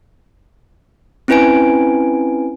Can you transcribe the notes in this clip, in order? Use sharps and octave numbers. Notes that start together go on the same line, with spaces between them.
C4 C#4 E4 B4 G#5 D7